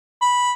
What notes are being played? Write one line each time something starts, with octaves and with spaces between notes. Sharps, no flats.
B5